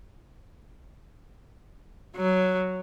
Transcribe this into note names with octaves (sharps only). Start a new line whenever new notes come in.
F#3